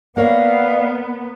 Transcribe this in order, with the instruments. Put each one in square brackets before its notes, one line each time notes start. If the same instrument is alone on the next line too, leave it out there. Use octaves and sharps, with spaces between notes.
[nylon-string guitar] A#3 A#4 C#5 [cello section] B3 [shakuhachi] D5 [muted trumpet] F5